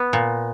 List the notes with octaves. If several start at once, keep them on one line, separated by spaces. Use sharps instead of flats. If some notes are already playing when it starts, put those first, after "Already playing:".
Already playing: B3
A#2